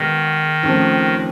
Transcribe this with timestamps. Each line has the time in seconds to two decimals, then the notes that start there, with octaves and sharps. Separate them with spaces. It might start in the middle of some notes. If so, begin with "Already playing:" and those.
Already playing: B2 D#3 G#3 B3
0.63 D#2 C#3 F3 A3 C4